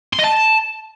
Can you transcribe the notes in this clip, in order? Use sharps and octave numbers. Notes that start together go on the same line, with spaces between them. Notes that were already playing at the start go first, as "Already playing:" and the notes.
C6
D#5
A5